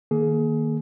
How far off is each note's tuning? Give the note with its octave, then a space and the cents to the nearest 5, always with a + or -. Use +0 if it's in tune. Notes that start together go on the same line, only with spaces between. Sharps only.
D#3 -10 A#3 +0 G#4 +25